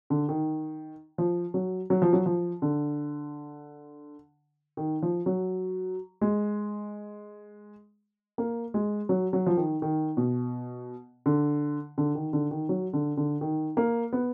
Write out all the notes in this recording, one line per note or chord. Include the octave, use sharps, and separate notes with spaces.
D3
D#3
F3
F#3
F#3
F3
F#3
F3
D3
D#3
F3
F#3
G#3
A#3
G#3
F#3
F#3
F3
D#3
D#3
B2
D3
D3
D#3
D3
D#3
F#3
D3
D3
D#3
A#3
B3